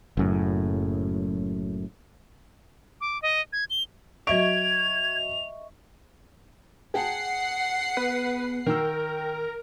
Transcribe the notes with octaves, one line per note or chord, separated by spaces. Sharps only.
F#1 F#2 A2
D6
D#5
G#6
G7
F#3 D#5 E5 C#6 G#6 D7 F7
G#4 F#5 G5 A5 C7
B3 B4
D#3 A#4 G5 E6